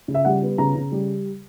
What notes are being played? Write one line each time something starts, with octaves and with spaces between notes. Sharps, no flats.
C#3
E5
G3 F#5
B3
C#3 A#5
C#3
G3